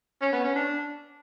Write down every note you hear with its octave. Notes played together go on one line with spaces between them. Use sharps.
C#4
B3
C#4
D4